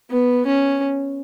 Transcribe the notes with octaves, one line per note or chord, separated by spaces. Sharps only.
B3
C#4